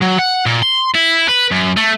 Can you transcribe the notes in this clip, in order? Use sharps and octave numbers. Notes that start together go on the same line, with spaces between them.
F#3
F#5
A#2
C6
E4
B4
F#2
A3